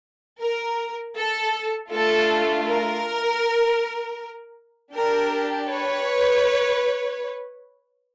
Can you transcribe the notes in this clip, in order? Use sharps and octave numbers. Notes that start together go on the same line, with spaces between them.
A#4
A4
A3 D4 F4 A4
A#4
D4 G4 A#4
B4 C#5